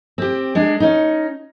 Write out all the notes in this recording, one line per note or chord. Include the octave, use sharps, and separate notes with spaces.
C4 G4
G#3 D4
C#4 D#4